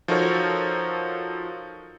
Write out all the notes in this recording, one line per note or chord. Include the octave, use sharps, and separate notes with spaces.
F3 D#4 F#4 A4 A#4 C#5